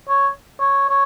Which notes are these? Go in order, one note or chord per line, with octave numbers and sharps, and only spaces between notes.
C#5
C#5
C#5